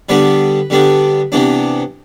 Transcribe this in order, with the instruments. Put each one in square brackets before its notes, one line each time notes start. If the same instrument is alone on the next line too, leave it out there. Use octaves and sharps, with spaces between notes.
[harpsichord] D3 G3 B3 D4 B4
D3 G3 B3 D4
C3 E3 B3 D4